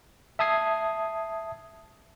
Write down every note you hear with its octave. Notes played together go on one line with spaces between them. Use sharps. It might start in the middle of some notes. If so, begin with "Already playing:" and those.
E5 A5 D#6 G#6 C7